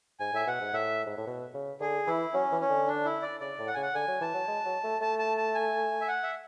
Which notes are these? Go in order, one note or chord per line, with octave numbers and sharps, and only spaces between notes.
G#2 G#5
A2 E5
B2 F#5
G#2
A2 E5
G#2
A2
B2
C#3
D3 G#4
E3 E4
F#3 C#4
E3
C#4
D3
D4
E4
D5
C#3 D5
A2
F#5
C#3 G#5
F#5
D3 G#5
F#3
E3 A5
F#3
G#3
F#3
A3
A3 A5
A5
A5
G#5
E5
F#5
E5